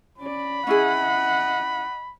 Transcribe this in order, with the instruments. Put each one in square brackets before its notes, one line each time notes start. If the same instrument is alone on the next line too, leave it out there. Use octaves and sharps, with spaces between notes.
[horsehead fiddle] C#4 D5 [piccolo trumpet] B5
[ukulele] C#4 E4 G#4 [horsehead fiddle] D#5 F#5